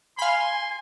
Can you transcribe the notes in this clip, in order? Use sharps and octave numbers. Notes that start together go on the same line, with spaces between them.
F5 G#5 B5 C6